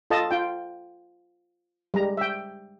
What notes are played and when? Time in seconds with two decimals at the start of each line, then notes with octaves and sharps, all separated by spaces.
0.10 F4 A4 D#5 A5
0.31 F4 G5
1.94 G3 G#3 A#5
2.17 E5 G5